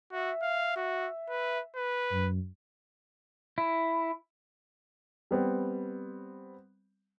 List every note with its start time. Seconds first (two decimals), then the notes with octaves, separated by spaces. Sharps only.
0.12 F#4 E5
0.42 F5
0.76 F#4
1.29 B4
1.75 B4
2.10 F#2
3.58 E4
5.31 G3 B3 C4